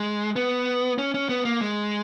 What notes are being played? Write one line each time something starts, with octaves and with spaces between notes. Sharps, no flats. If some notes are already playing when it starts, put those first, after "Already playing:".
Already playing: G#3
B3
C#4
C#4
B3
A#3
G#3